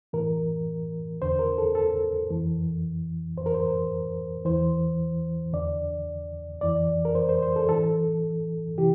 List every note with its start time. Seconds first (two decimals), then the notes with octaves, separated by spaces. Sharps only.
0.13 A2 E3 A#4
1.22 E2 D3 C5
1.39 A#4
1.58 A4
1.75 A4
2.30 F2 E3
3.37 F2 C5
3.41 E3 A#4
3.54 C5
4.45 E2 E3 C5
5.53 E2 D3 D5
6.61 F2 E3 D5
7.05 A#4
7.15 C5
7.29 C5
7.42 C5
7.56 A4
7.69 A2 E3 A4
8.78 C3 E3 G4